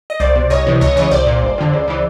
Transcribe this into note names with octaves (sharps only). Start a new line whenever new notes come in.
D#5
C2 C5 D5
B2
C2 C#5 D#5
C3 E3
C#2 C#5 D#5
C#3 E3 C#5 D#5
C2 C5 D5
A#2
G1
F2 D3
C#2
C#3 E3